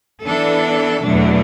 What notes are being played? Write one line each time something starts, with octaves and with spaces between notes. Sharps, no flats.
E3 B3 D4 A4
E2 B2 F#3 A3 D4